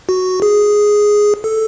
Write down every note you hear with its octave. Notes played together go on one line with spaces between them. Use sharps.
F#4
G#4
A4